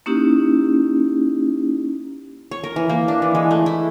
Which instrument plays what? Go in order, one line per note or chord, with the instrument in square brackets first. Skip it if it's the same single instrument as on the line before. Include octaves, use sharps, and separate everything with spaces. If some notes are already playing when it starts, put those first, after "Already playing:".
[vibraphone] A#3 C#4 D#4 E4 G4
[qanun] C#5
A#4
E3
A#3
D4
E3
G#3
A3
E4